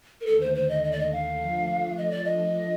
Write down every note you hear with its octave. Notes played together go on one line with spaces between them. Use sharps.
A#4
D#2 D3 A3 A4
C5
C5
D#5
D#5
D5
D#5
F5
F3 A3 D4
D#5
D5
D#5